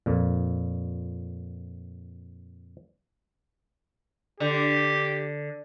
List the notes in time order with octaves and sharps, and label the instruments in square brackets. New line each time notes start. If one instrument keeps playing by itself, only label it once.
[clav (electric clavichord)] F2 A#2
[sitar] D3 [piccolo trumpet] G4